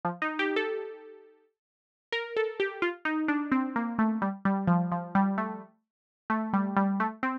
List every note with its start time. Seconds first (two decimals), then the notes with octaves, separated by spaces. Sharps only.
0.05 F3
0.22 D#4
0.39 G4
0.56 A4
2.12 A#4
2.37 A4
2.60 G4
2.82 F4
3.05 D#4
3.28 D4
3.52 C4
3.76 A#3
3.99 A3
4.22 G3
4.45 G3
4.67 F3
4.92 F3
5.15 G3
5.38 A3
6.30 A3
6.53 G3
6.76 G3
7.00 A3
7.23 C4